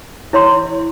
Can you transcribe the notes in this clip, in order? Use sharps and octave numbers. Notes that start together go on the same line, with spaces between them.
E4 C#5 C6